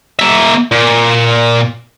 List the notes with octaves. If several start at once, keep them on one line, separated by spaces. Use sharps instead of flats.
A#3 E5
A#2